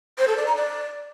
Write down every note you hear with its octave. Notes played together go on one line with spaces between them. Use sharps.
C5
A4
D5
A#5
D5